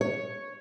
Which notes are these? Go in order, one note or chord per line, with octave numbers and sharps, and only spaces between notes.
C#5